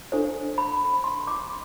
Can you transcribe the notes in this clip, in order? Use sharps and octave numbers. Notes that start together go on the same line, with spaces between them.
D4 A4 C5
B5
C6
D6